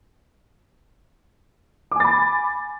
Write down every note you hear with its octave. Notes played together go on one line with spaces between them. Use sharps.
G#5 B5 D6 A6